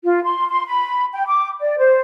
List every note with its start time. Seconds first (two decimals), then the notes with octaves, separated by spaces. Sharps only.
0.04 F4
0.23 C6
0.48 C6
0.66 B5
1.14 G5
1.27 D6
1.60 D5
1.78 C5